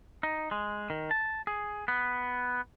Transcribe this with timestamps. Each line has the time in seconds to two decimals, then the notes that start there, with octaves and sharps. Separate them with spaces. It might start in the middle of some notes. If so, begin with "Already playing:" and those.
0.23 D#4
0.51 G#3
0.90 D#3
1.11 A5
1.47 G#4
1.88 B3